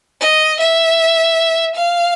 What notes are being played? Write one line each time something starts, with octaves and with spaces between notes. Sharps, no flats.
D#5
E5
F5